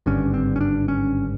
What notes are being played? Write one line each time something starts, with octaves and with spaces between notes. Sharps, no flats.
G#1 G2 D3 C#4
C4
C#4
D4
C#4